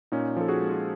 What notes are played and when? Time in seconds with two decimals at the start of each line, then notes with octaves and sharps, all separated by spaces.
0.12 A#2 C#4 D#4
0.37 F3 A4
0.48 F#4 G#4
0.61 G#3
0.73 F#4